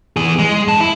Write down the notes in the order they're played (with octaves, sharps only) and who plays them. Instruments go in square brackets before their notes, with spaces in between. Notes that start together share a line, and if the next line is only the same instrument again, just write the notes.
[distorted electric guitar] E3 G#4
G#3
F#2 A5
E4